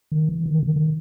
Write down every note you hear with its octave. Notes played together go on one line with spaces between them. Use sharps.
D#3
E3
D#3
D3
D#3
D#3